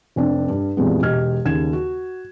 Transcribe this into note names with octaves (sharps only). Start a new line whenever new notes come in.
F1 C4 D4
G2
F2 A#2 E3 G3 G#3 B3
E1 G4 D#5 F6 G#6
D#2 C#3 G#6 E7
F#4